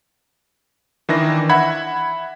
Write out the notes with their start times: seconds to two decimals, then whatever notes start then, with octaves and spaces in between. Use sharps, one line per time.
1.09 D#3 E3 D4 A#6
1.49 E5 F#5 B5 G#6